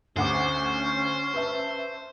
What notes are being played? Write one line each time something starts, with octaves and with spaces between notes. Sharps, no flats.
D2 C#4 C5 F#5 D6
B4 E5 A5